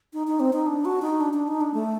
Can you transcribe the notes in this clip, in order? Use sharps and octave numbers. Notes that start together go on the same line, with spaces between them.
D#4
D#4
C4
D#4
D4
F#4
D#4
D4
D4
D#4
D4
A3